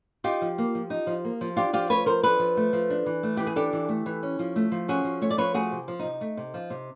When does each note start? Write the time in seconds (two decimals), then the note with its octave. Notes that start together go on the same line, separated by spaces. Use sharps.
0.24 D#4 F4 G4
0.42 F3
0.58 A#3
0.75 F3
0.90 D#4
1.07 F3
1.25 A#3
1.41 F3
1.57 D4 F4 G4
1.73 F3 F4 G4
1.90 A3 B4 C#5
2.06 F3 A#4 C5
2.23 D4 A4 B4
2.39 F3
2.57 A3
2.73 F3
2.90 D4
3.06 E3
3.23 A3
3.37 E3 G4
3.47 G#4
3.56 D4 G4 A4
3.73 E3
3.89 A3
4.06 E3
4.23 C#4
4.39 F3
4.56 A3
4.72 F3
4.88 C#4 F#4 G#4
5.04 F3
5.21 A3 C#5
5.30 D5
5.37 F3 B4 C#5
5.54 A3 F#4 G#4
5.72 C3
5.88 F3
5.99 C3 D#4
6.21 A3
6.37 C3
6.54 F3
6.70 C3